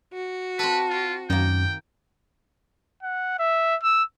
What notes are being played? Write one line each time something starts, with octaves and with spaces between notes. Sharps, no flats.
F#4
C4 A4 B4
F4
F#2 D#3 A#3 G5
F#5
E5
E6